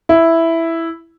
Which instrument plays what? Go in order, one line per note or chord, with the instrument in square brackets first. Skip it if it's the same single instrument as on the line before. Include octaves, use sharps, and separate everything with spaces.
[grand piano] E4